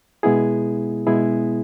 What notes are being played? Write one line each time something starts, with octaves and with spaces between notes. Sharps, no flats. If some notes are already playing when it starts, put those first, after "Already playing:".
B2 G#3 B3 E4 G#4
B2 G#3 B3 E4 G#4